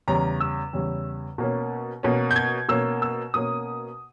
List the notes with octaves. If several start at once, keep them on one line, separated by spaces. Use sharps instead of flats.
E2 C#3 G3 C#4 A#5
E6
E2 C#3 G3 C#4
B2 A#3 C#4
B2 A#3 C#4
G6
G#6
B2 A#3 C#4 E6
E6
B2 A#3 C#4 D#6